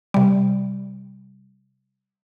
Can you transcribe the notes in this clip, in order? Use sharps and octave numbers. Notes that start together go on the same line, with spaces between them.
C3 G3